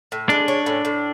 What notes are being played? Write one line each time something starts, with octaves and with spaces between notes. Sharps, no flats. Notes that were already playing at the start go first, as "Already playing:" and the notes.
A2
G#3 D4
C#4
A2
A2